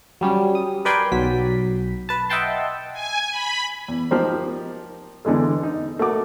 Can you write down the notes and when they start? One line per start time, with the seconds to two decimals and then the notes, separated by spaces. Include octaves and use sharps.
0.21 F#3 G3 C#4
0.55 D#6
0.85 A#4 B4 D5 G5 G#5 C6
1.12 B1 F#3 B6
2.09 B4 A5
2.30 D#5 E5 F#5 G5 A5 C6
2.93 G#5
3.31 B5
3.88 E2
4.11 F3 A#3 D#4 G4 A#4 C5
5.25 E2 D3 E3 G#3 A3
5.63 D#4
5.99 A3 A#3 F#4 D6